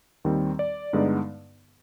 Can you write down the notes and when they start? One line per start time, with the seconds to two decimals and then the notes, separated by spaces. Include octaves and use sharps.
0.25 D#2 D#3 G3 C4
0.59 D5
0.93 G2 D3 G#3 B3 D#4